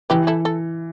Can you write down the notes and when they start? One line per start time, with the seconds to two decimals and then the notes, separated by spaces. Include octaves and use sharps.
0.10 E3 G4 B4
0.27 E4 A4
0.45 A4